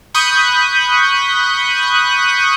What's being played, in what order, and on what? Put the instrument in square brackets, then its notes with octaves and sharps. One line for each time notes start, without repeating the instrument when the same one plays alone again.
[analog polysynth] B5 C#6 D#6 F#6 G6